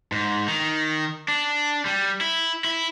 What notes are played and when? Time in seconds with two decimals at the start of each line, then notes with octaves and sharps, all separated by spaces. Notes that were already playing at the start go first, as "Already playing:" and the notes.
0.12 G#2
0.48 D#3
1.28 D4
1.86 G3
2.21 E4
2.64 E4